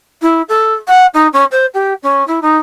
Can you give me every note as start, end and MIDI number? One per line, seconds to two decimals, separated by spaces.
0.22 0.42 64
0.49 0.74 69
0.88 1.07 78
1.14 1.28 63
1.33 1.45 61
1.51 1.66 72
1.74 1.93 67
2.03 2.26 61
2.27 2.40 64
2.42 2.57 63